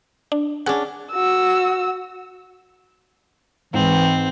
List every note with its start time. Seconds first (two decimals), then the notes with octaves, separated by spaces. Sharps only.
0.32 D4
0.66 C#4 D4 G#4 F#5
1.12 F#4 E6
3.74 G#2 E3 C4